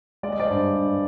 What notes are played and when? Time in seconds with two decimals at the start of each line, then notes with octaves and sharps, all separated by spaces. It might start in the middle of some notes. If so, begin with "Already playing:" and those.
0.23 G#3 D5
0.32 D#5
0.40 C5 D5
0.50 G2
0.76 G2